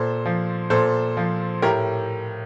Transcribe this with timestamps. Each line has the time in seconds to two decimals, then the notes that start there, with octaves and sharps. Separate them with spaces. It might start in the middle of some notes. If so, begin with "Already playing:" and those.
Already playing: A#2 A4 C5
0.26 F3
0.70 A#2 A4 C5
1.17 F3
1.62 A2 G4 A#4